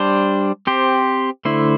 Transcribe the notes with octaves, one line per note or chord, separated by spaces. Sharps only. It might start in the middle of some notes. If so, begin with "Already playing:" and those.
Already playing: G3 D4 C5
C4 G4 C5
D3 A3 E4 C5